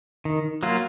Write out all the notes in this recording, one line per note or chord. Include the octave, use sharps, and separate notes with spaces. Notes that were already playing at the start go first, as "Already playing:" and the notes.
D#3
F#3 A#3 F4